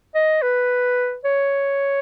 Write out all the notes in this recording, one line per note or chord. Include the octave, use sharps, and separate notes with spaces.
D#5
B4
C#5